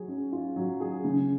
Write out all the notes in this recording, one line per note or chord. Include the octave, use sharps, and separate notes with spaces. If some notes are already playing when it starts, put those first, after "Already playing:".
Already playing: F#3 G#4
C#4
F4
F#3
G#4
C#3